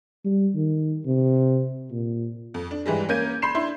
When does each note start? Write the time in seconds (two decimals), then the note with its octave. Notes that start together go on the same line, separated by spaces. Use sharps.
0.25 G3
0.55 D#3
1.06 C3
1.92 A#2
2.54 F2
2.71 D4
2.86 G#2 E3 G3 G#3
3.09 A#3 C#4 A#4 G6 G#6 D#7
3.42 B5 C6 C7 E7
3.55 D4 E4 C6